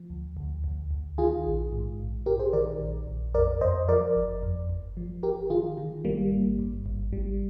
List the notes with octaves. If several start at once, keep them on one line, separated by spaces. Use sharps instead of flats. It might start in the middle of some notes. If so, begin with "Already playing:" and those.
Already playing: F3
D2
D2
D2
D2
D#3 F4 G#4
A#1
G#2
A#1
A#1 G4 A#4
G#4 C5
D#3 A#4 D5
A#1
A#1
F2 A#4 D5
F2 C5 D#5
F3 A#4 D5
G1
F2
G1
F3
G1 G4 A#4
D#3 F4 G#4
D#3
G#1 G3 A#3
G#1
G2
G#1
G#1 G3